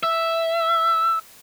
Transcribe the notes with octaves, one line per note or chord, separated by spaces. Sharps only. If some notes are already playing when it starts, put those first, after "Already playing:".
E5